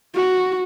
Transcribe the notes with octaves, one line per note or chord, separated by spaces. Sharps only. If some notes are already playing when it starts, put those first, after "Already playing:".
F#4